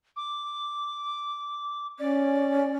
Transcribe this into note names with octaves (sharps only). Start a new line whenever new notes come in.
D6
C#4 D5